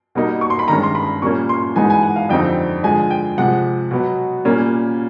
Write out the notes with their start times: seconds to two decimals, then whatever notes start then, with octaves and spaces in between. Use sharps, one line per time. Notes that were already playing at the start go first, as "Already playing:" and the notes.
0.15 B2 G3 A#3 D#4
0.41 C#6
0.50 C6
0.59 B5
0.68 G2 D#3 G#3 C#4 A#5
0.83 C6
0.95 B5
1.22 A#2 G3 A#3 C#4 C#6
1.49 C6
1.76 G#2 E3 G#3 B3 D#4 G#5
1.90 G#5
2.03 F#5
2.16 F5
2.29 F2 D3 G3 C4 D#4 G5
2.83 D3 F3 G#3 G#5
3.11 G5
3.38 C3 F3 G#3 F#5
3.91 B2 F#3 B3
4.45 A#2 G3 A#3 C#4